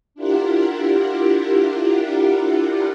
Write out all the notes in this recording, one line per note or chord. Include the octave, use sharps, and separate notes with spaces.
D4 E4 F4 G4 A#4 F#5